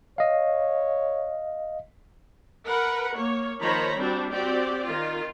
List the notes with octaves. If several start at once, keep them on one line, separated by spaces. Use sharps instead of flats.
C#5 D#5 F5
A#4 B4 F#5
A#3 C#5
D#3 F3 C5 C#5 A#5 B5
G3 C4 D4 F#4
C4 F#4 G4 D5
D#3 F4